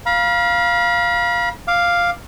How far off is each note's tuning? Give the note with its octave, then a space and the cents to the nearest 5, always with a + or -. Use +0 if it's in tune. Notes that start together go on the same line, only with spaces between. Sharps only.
F5 +0 B5 -45
F5 +0 D6 +0